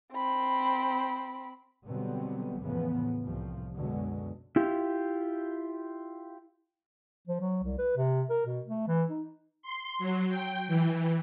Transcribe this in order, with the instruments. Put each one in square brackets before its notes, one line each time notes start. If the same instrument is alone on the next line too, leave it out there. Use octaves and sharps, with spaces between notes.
[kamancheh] C4 B5
[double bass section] B2 D3 F#3 G3 B3 C4
E2 A2 C#3 F3 B3
C2 A2 F3
F#2 B2 D3 F#3 G#3
[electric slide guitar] E4 F4 G4
[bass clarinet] F3
F#3
C2
B4
C3
A#4
B2
A3
E3
D#4
[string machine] C6
F#3
G5
E3